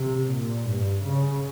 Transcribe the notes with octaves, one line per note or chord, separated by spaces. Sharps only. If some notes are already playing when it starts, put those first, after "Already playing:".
Already playing: C3
A#2
G2
C#3